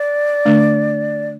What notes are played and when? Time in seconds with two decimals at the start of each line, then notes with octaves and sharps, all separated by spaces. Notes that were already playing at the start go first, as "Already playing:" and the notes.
Already playing: D5
0.45 D3 A3 D4